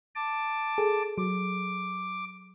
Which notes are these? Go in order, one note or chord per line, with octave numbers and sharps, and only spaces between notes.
A5 D6
G#4 A4
F#3 D6